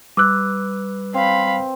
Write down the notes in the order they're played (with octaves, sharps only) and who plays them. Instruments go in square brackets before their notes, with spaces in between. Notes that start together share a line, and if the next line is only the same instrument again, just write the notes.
[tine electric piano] G3 [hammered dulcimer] B4 [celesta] D6 E6 F#6
[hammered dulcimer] C4 [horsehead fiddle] F5 B5